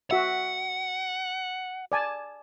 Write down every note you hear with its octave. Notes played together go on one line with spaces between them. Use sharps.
F#4 E5 F#5
D5 G#5 A5